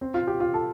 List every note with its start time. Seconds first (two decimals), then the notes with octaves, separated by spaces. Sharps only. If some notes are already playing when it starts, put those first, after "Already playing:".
0.01 C4
0.14 F4
0.27 G4
0.40 F4
0.54 A4